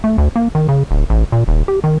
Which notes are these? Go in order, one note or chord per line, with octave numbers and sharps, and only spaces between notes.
A3
D2
A#3
D#3
C#3
D1
A1
A#2
D#1
G4
D#3